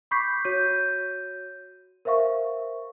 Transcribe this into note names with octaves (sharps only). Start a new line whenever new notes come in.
B5 C#6 D6 G6 B6 C7
F#4 C#5 G6 D#7
A#4 C5 E5 F5 C#6